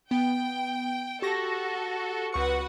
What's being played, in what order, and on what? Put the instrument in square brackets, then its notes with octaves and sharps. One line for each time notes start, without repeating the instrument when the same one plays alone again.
[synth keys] B3 [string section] G5
[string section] F#4 A4 [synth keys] G4 C#6 A#6
[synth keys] C#2 C#6 C#7 [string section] F#4 B4 F#5